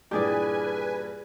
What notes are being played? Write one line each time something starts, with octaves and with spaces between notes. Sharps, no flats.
G2 A#2 E3 G4 G#4 B4 D5 G#5